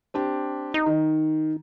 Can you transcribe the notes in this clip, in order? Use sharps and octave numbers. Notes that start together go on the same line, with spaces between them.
C4 D4 G4
D#4
D#3